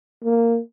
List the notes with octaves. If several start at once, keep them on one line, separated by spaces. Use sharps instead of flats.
A#3